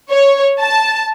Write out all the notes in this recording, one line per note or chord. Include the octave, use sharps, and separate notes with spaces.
C#5
A5